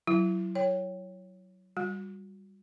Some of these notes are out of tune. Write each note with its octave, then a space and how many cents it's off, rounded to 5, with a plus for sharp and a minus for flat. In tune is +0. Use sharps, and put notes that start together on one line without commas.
F#3 +10 E4 +25
C#5 +0 G5 +0
G3 +0 F#4 -30